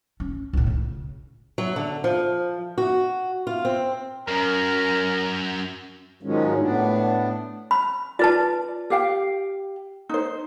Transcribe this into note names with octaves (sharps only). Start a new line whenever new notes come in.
C#4
C#2 A2
C#3
F#3
D3
F3
F#4
F4
C4
F#2 C#4 A#4
G#2 D#3 F3 F#3 G#3 C#4
A2 B3 D4
B5
F4 B4 D5 A5
G4 F5 G5
D#4 C5